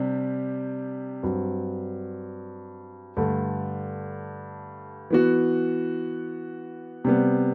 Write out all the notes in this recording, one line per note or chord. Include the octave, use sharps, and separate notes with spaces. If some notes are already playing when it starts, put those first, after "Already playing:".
Already playing: C3 G3 D4
G2 F#3 C4
G2 D3 A3
E3 B3 F#4
C3 G3 B3